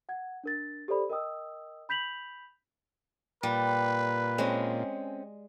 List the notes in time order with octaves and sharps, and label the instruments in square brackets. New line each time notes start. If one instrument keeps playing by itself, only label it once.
[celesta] F#5 G#6
D4 A#4 A6
G4 A4 C5 D5 B5
A#4 D#5 G5 D#6 E6
B5 G6 B6 F7 F#7
[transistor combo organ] A#2 [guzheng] G3 [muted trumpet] B4
[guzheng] G#3 [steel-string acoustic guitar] C4 C#4